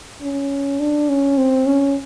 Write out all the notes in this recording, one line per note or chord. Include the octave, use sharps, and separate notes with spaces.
C#4
D4
C#4
C4
C#4